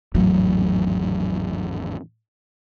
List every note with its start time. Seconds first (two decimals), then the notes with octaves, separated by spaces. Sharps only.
0.15 G#1 E2 A2 F#3